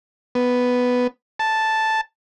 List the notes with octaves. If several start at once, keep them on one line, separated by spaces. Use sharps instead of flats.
B3
A5